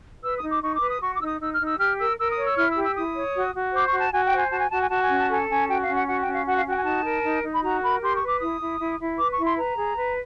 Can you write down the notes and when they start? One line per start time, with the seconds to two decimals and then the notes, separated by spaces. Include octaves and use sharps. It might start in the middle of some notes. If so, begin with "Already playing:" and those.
0.24 B4 E6
0.37 D#6
0.43 D#4
0.50 D6
0.63 D#4 C#6
0.76 D6
0.82 B4
0.89 D#6
1.01 F#4 C#6
1.14 D6
1.21 D#4 E6
1.27 D#6
1.40 D#4 E6
1.54 F6
1.60 D#4
1.66 E6
1.79 G4 F6
1.99 A#4 E6
2.18 A#4 E6
2.31 D#6
2.37 C#5
2.45 E6
2.57 E4 F6
2.70 E6
2.77 G4
2.84 E6
2.96 E4 D#6
3.16 C#5
3.35 F#4
3.54 F#4
3.73 C5 D6
3.86 C#6
3.93 F#4
4.00 A5
4.12 F#4 G#5
4.25 G5
4.32 C5
4.38 G#5
4.49 F#4 A5
4.59 G#5
4.70 F#4 A5
4.79 G#5
4.89 F#4 A5
5.00 G#5
5.09 C#4
5.18 A5
5.29 A4 G#5
5.49 C#4 G#5
5.68 F#4 G5
5.82 F5
5.88 C#4
5.94 F#5
6.07 F#4 F#5
6.20 G5
6.27 C#4
6.33 F5
6.46 F#4 F#5
6.56 F5
6.65 F#4 G5
6.75 G#5
6.84 D#4 A5
7.04 A#4
7.23 D#4
7.43 D#4
7.51 B5
7.62 F#4 A#5
7.82 A#4 B5
8.01 G4 C6
8.14 C#6
8.21 B4
8.27 D6
8.40 E4 D#6
8.60 E4
8.79 E4
8.99 E4
9.18 B4 D6
9.32 C#6
9.37 E4
9.45 C6
9.57 B4 A#5
9.76 G#4
9.97 B4